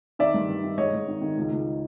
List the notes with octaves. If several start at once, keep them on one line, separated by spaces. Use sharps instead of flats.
D#3 D5 E5
G2
G2
D#3
G#2 C#5 D#5
G#2
D#3
D#3
C#2
C#2